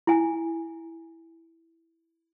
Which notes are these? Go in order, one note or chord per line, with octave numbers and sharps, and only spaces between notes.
E4 G#5